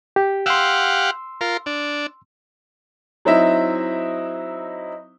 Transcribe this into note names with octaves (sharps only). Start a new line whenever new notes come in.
G4
G4 F5 F#5 C6 E6
F4 A#4
D4
F#3 C4 D#4 E4 E5